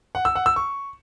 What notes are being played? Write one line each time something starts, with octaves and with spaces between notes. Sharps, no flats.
F#5
E6
F#5
E6
C#6